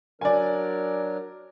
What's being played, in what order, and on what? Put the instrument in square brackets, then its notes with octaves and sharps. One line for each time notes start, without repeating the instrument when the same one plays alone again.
[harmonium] F#3 D4 A#4 [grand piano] D5 G#5